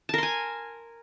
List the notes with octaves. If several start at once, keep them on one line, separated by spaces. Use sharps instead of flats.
A#4 G#5 A5 C6